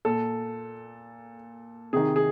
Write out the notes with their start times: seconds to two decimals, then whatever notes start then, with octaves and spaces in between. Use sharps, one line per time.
0.05 A#2 A4
1.93 C3 D#3 G#4
2.16 G#4